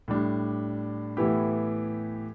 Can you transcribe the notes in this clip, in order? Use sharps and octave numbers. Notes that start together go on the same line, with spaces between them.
A2 G3 D4
A2 E3 B3 E4 G4